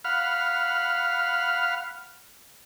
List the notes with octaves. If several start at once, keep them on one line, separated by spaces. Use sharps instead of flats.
F5 F#5 B5 F6